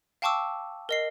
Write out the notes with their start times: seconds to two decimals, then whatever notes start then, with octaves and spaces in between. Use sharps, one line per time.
0.22 F5 G5 A5 C#6 D6 E6
0.89 A#4 D#5 C7